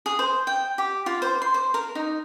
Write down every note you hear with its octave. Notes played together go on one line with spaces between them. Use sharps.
G#4
C5
G5
G4
F4
C5
C6
C5
A#4
D#4